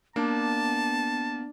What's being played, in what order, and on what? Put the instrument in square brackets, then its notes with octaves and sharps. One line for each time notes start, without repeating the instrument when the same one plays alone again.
[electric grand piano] A#3 [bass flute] B3 [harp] D4 [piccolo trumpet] A5